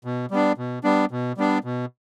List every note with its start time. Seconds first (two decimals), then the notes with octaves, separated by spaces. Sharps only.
0.05 B2
0.31 G3 B3 D4
0.58 B2
0.84 G3 B3 D4
1.11 B2
1.38 G3 B3 D4
1.64 B2